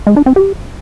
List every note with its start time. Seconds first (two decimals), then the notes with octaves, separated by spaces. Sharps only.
0.07 G#3
0.16 D4
0.26 C4
0.36 G4